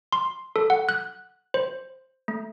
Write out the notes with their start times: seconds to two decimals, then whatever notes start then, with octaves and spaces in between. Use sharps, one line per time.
0.12 C6
0.56 A4
0.70 F#5
0.89 F#6
1.54 C5
2.28 A3